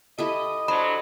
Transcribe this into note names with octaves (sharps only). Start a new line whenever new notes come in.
E4 G4 A4 D#5
D3 F#3 D4 C5 B5